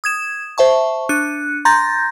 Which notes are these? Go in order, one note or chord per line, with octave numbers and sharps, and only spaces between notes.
D#6 G#6 E7
C5 E5 A5 C#6
D4 F#6 C#7 D#7
A#5 C6 G6 A6 A#6